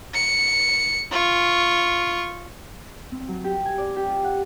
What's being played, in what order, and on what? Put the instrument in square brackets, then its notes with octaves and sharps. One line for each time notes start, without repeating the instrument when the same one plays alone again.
[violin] C#7
F4 C#6
[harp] C4
F#3
G4
G#5
D5
G4
F4
F#5